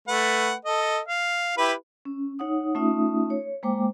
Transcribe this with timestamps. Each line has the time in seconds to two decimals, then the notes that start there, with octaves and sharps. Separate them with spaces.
0.08 A3 B4 F#5
0.65 A4 D#5
1.08 F5
1.58 E4 G4 B4
2.05 C#4
2.39 D#4 C#5 F#5 D#6
2.75 A3 C#4 D#4 F4 E5 D#6
3.30 C#5
3.63 G#3 A#3 C5 G5 D6